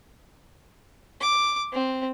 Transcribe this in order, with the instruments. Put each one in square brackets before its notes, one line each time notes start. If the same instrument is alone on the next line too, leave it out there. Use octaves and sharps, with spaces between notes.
[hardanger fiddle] D6
C4